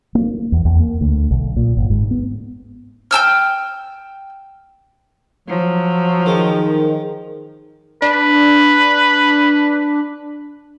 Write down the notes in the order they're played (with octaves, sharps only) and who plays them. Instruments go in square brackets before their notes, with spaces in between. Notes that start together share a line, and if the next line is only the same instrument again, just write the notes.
[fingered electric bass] A#3
E2
E2
A#3
D2
B1
A#2
G1
G#2
B3
[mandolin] G5 A5 E6 F6
[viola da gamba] F3 [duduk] F#3
[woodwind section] D#3 [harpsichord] G#3
[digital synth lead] D4 [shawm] B4